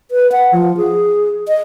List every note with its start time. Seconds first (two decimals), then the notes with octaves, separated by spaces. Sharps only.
0.11 B4
0.32 F#5
0.52 F3
0.77 G#4
1.48 D#5